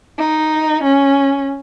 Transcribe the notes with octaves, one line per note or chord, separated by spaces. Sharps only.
D#4
C#4